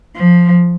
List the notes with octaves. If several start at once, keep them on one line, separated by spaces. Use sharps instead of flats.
F3